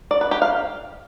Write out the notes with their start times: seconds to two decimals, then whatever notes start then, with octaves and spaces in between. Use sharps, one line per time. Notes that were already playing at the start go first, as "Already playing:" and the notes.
0.11 D5
0.21 B4
0.31 G4
0.42 F5